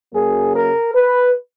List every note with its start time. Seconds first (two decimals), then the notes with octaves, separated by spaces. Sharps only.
0.14 F#2 C#3 F#3 A#3 G#4
0.55 A#4
0.95 B4